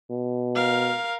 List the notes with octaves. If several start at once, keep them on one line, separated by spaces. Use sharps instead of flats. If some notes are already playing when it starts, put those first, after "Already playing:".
B2
A#4 F5